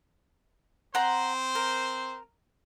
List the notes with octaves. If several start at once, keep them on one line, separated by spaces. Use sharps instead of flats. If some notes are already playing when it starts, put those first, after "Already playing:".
C4 C5 F#5 A#5
A#4